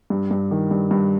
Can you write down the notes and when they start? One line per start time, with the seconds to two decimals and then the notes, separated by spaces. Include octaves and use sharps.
0.10 G2
0.31 G2
0.51 D#3
0.71 G2
0.91 G2